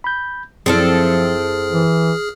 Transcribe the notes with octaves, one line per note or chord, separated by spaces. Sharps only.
B5 G6
F#2 F3 C4 E4 G#4 A4 E5 F6
E3